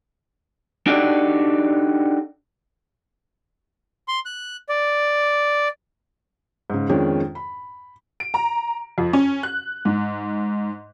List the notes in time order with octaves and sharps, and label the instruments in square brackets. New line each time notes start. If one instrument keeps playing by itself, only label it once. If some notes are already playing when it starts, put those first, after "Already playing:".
[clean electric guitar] D4 D#4 F#4 G4 A4 D5
[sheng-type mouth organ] C6
F#6
D5
[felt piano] G#2 C#3
F2 D#3 G#3 C#4 D4
B5
[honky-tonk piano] D7
A#5
F2
C#4
F#6
G#2